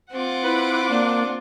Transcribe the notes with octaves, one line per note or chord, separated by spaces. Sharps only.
C4 F4 F#5 D6
E4 B4
A#3 D4